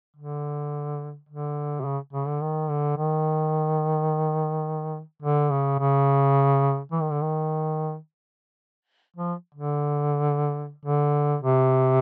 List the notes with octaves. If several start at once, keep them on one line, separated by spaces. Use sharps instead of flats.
D3
D3
C3
C#3
C#3
D3
D#3
D3
D#3
D3
C#3
C#3
E3
D#3
D3
D#3
F3
D3
D3
C3